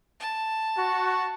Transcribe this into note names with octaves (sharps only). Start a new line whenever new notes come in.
A5
F#4